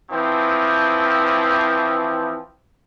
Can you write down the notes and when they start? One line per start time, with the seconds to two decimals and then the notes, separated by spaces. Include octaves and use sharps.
0.10 E3 F3 C4